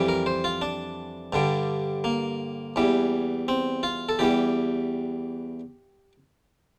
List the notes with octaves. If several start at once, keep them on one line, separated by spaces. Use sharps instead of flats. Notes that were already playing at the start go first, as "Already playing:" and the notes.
Already playing: F2 E3 G3
A#4
C5
F4
D4
G2 D3 G3
A#3
E2 E3 G3
C4
F4
A4
E2 E3 G3 G4